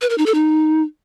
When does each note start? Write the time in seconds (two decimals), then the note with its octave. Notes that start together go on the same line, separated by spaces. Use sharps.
0.02 B4
0.10 A#4
0.18 D#4
0.26 A4
0.34 D#4